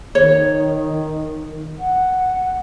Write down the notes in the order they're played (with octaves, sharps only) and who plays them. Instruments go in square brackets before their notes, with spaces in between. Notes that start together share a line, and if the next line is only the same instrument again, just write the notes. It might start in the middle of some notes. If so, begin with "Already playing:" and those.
[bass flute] D#3 [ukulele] C#5
[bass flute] F#5